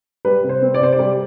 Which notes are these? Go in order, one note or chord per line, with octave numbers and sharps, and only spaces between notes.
G3 B4
C3
C5
C4
D5
C3 C5
D5
G3